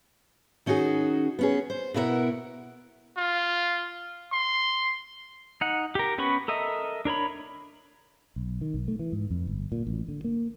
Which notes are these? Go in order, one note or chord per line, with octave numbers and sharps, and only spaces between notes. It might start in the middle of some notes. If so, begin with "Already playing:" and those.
D#3 C#4 D#4 F#4 G#4
B3 C#4 G#4
C5
B2 B3 E4 A#4 E5 F#5
F4
C6
D#4 F#5
G4 A#4
B3 C#4 B4 B5 C#6
A4 A#4 D#5 E5
D4 A#4 C#5 B5
B1
D#3
B1
A3
E3
G#2
F2
G1
A#2
A1
D3
A#3